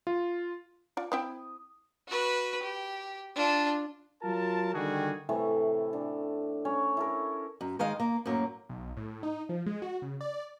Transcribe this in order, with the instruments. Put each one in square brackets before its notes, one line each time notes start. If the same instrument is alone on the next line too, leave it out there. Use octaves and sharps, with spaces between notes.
[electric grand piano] F4
[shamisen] F4 D5
[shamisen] C4 E4 G5 [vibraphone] D#6
[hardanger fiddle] F#4 B4
G4
D4 F4
[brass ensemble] F#3 F4 A#4 A5
D3 D#3 G3 F#4 G#4
[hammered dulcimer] A2 C3 E3 A3
D4
C#4 C#5 D5
E4 A4 A#4
[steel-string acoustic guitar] F#2
D#3 G#3 D#5 F5
A#3
F#2 A2 F#3 A#3
[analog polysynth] B1
A2
D#4
F3
G#3
F#4
C#3
D5